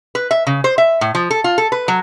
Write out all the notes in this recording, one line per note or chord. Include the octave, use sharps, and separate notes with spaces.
B4
E5
C#3
C5
E5
A2
F3
A4
F4
A4
B4
F#3